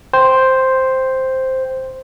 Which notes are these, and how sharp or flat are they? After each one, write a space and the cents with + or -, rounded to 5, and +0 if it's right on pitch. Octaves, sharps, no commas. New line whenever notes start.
C5 +0 G5 +0